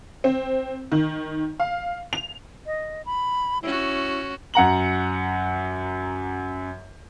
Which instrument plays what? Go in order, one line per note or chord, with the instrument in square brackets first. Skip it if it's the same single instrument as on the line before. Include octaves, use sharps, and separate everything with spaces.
[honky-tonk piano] C4
D#3
F5
F7
[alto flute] D#5
B5
[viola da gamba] C#4 F#4 [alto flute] E4
[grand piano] F#2 F#5 A#5 F#7